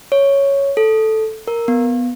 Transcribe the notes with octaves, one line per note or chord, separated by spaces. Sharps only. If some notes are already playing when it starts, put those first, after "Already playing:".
C#5
A4
A#4
B3